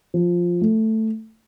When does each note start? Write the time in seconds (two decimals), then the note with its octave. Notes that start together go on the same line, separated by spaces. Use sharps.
0.14 F3
0.61 A3